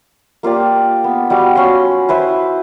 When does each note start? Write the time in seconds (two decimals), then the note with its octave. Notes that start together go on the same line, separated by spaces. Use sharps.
0.43 A#3 F4 G4 D5
1.04 B3
1.30 G3 F#4 F5 D6
1.55 C#4 F#4 B5 C6
2.09 E4 B4 C5 E5